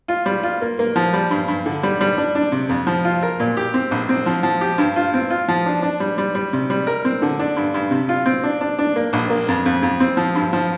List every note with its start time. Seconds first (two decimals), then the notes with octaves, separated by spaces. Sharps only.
0.08 F4
0.26 G3
0.43 F4
0.61 A#3
0.79 A#3
0.96 F3
1.13 G3
1.30 G2
1.48 G2
1.66 D3
1.83 G3
2.01 G3
2.18 D4
2.35 D4
2.52 C3
2.69 F2
2.87 F3
3.05 F4
3.22 A#4
3.40 A#2
3.57 G4
3.74 C4
3.91 A#1
4.09 C4
4.26 F3
4.43 F3
4.61 G4
4.78 G2
4.96 F4
5.14 C4
5.30 F4
5.48 F3
5.66 D4
5.82 D4
6.00 G3
6.18 G3
6.35 G3
6.53 C3
6.70 G3
6.87 A#4
7.05 C4
7.22 D3
7.39 D4
7.56 G2
7.74 G2
7.91 C3
8.09 F4
8.26 C4
8.44 D4
8.61 D4
8.79 D4
8.96 A#3
9.13 A#1
9.30 A#3
9.48 F2
9.65 F2
9.82 F2
10.00 C4
10.17 F3
10.35 G2
10.53 F3